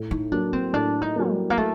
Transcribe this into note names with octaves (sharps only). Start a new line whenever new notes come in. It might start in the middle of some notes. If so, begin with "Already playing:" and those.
Already playing: A2
D#4
F#3 A#3 D4
C4
A2 D4
D#4
F#3 A#3
G3
A#3
A3